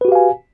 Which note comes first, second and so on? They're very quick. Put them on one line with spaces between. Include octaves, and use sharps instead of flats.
B4 F#4 G4 F5 G#5